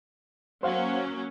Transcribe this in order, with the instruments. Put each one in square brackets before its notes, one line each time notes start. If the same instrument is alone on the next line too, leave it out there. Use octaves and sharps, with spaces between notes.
[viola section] F#3 A#3 C#4 [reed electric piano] C5 F5 F#5